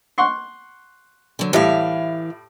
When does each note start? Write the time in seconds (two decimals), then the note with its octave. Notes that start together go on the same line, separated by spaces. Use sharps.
0.18 F#5 C6 C#6
1.39 D3 F#3
1.53 A2 E3 G3 E5 F5